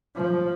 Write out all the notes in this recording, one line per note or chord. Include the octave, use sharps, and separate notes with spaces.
F3